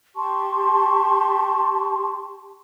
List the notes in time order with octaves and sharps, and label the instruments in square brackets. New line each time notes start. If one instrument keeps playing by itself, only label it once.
[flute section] G4 A5 C6 C#6